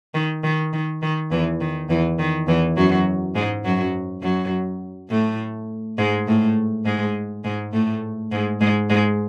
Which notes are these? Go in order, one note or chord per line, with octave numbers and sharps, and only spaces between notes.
D#3
D#3
D#3
D#3
E2 E3
D#3
E2 E3
D#3
E2 E3
F#2 F#3
G#2 G#3
F#2 F#3
F#2 F#3
A2 A3
G#2 G#3
A2 A3
G#2 G#3
G#2 G#3
A2 A3
G#2 G#3
G#2 G#3
G#2 G#3